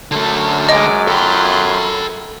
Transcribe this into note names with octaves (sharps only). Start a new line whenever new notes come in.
F#2 D3 A3
G#3 D#5 D6
A4 G5 B5 C6